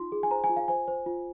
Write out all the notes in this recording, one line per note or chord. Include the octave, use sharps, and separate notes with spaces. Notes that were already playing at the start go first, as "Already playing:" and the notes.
Already playing: D#4 F4 C6
G#4
G#5
C5 A#5
G#5
F4
F5
C5 G#5
C5
F4